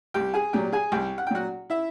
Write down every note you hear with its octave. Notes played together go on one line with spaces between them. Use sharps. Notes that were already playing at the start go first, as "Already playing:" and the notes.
C2 G4 G5
G#4 G#5
A#2 F#3 G4 G5
G#4 G#5
C2 G4 G5
F#5
G5
A#2 F#3 F#4 F#5
E4 E5